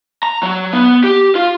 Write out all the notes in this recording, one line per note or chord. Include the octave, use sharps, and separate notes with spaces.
A#5
F#3
B3
G4
F4